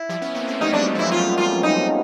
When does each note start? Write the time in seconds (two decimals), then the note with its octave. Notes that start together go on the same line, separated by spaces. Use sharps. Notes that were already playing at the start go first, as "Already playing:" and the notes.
Already playing: E4
0.09 F3 G3
0.21 B3 C#4
0.34 A#3 C4
0.47 A3 B3
0.61 G3 A3 D#4
0.73 F#3 G#3 D4
0.94 F3 G3 E4
1.12 F4
1.38 F4
1.63 D#4